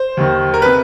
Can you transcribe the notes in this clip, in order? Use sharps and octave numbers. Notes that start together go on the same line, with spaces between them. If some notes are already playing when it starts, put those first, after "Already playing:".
Already playing: C5
D#2 D#3
A#4
C3 B4